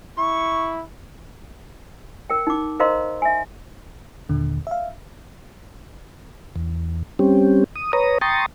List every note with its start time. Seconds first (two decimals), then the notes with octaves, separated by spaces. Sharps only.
0.18 E4 C#6
2.30 A#4 G5
2.47 D#4 D6
2.80 A#4 C5 D#5 F5 A#5 C6
3.22 E5 G#5
4.29 D#2 A#2 D3
4.67 E5 F5
6.56 E2
7.19 G3 C4 C#4 G4
7.76 D#6
7.93 B4 C#5 A#5 D#6
8.21 G5 A#5 C6 C#6 D#6 A6